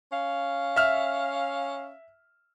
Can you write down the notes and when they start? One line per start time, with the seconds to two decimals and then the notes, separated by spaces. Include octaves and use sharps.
0.13 C#4 F5
0.76 E5 F6